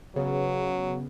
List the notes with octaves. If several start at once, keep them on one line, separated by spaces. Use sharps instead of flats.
C#3 F#3 B3